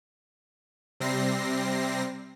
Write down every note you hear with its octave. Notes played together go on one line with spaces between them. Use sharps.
C3 G3 C4 A#6 C7